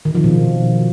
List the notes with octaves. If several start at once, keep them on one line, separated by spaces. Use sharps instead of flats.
D#3
F3
B2